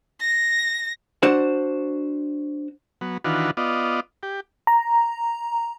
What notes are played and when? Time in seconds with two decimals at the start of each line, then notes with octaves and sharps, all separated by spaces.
0.20 A#6
1.23 D4 F#4 C5 F#5
3.01 F#3 B3
3.24 D#3 E3 D4 F4 F#4 B4
3.57 B3 F4 D5 D#5
4.23 G4
4.67 A#5